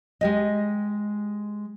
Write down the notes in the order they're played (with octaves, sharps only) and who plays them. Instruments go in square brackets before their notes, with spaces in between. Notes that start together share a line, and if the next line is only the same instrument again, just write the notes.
[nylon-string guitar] G#3 G4 D#5